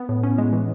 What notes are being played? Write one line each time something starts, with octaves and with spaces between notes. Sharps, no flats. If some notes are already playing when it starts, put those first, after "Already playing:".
Already playing: B3
A2
C#4
G#3
E3